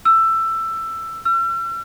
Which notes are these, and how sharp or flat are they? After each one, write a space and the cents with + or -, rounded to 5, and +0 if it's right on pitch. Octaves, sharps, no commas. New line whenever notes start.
E6 +15
E6 +45